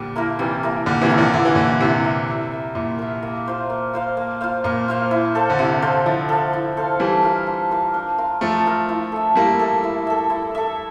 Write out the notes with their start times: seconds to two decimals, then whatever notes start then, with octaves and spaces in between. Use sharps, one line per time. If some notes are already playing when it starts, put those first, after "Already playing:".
Already playing: A#2 D3 G3
0.16 A#3 E4 A#4
0.39 C3 E3 G3
0.63 A#3 E4 A#4
0.86 A#2 D3 G3
1.02 C3 E3
1.10 A#3 E4 A#4
1.18 D3 F3
1.33 D3 E4
1.45 E3
1.55 A#2 D3 A#4 E5
1.80 C3 E4
2.05 A#4 E5
2.28 E4
2.52 A#4 E5
2.75 A#2 E4
2.99 A#4 E5
3.23 A#3
3.46 F4 C5 F5
3.70 A#3
3.94 F4 C5 F5
4.17 A#3
4.41 F4 C5 F5
4.64 A#2 A#3
4.88 F4 C5 F5
5.11 E4
5.35 A4 C5 F5
5.50 D3
5.59 C3 E4
5.82 A4 C5 F5
6.06 D3 F3 E4
6.29 A4 C5 F5
6.53 E4
6.77 A4 C5 F5
6.99 E3 G3 D4
7.23 F4 A#4 F5
7.47 D4
7.71 F4 A#4 F5
7.94 D4
8.18 F4 A#4 F5
8.41 F3 A3 D4
8.65 F4 A#4 F5
8.89 E4
9.12 A4 E5
9.36 G3 A#3 E4
9.59 A4 E5
9.84 E4
10.07 A4 E5
10.30 E4
10.55 A4 E5